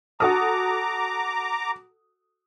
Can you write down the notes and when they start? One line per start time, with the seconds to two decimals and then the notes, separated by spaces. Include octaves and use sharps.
0.20 F#4 A4 A#5 D6 D#6